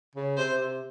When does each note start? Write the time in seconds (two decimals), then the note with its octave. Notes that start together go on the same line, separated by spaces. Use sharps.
0.15 C#3
0.37 C3 C5
0.59 C3